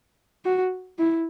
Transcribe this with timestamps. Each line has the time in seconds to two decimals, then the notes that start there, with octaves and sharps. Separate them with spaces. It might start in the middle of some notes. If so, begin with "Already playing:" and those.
0.45 F#4
0.99 E4